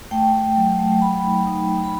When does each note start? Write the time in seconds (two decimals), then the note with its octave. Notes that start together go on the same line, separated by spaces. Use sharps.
0.11 A3 G5
0.33 A3
0.56 F#3
0.79 A3
1.01 A3 B5
1.24 D#4
1.46 D#4
1.70 F#3
1.84 B5